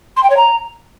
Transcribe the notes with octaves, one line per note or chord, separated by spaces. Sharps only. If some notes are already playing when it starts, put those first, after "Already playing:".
C6
G5
C#5
A#5